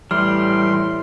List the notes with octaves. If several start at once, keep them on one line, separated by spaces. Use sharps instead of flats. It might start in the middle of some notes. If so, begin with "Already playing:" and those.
A2 E3 G3 C6 F6